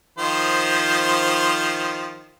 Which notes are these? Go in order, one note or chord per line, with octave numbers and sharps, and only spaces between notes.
D#3 F3 C5